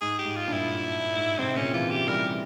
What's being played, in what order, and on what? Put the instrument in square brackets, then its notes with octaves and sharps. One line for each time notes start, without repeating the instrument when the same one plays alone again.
[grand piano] G#2 [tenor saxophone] G#4
[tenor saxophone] G4
[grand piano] G#2
[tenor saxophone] F4
[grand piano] G2 A#2
[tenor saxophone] E4
[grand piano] G#2
[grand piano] G#2 C3 [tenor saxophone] C4
[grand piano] A#2 C#3 [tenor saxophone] C#4
[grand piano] C3 E3 [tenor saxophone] F4
[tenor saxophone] G4
[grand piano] E3 G3 [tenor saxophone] A#4